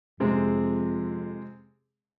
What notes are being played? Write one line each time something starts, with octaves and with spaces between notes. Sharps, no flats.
F2 C3 G#3 C4